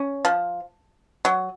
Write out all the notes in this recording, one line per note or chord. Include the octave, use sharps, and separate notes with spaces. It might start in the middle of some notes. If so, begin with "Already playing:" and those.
Already playing: C#4
F3
F#3